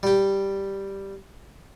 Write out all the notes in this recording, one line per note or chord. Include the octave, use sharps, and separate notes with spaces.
G3 G4